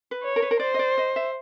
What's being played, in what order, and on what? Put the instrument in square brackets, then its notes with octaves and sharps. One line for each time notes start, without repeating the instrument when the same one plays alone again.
[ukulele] B4
[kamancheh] C#5
[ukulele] A#4
B4
A#4
[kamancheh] C5 [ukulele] D5
[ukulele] D#5
D5
D#5
E5